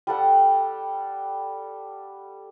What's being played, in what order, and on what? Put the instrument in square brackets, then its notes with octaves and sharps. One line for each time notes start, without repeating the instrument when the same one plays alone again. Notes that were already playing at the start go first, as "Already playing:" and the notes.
[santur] G3 A4 F#5